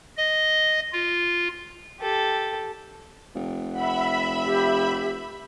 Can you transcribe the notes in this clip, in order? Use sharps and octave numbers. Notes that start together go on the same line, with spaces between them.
D#5
F4
G4 A4
F1
E5 F#5 B5
G4